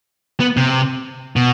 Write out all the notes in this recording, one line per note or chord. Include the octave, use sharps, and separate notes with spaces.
B3
C3
B2